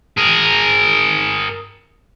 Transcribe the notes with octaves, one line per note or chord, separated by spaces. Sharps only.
G#4 A#4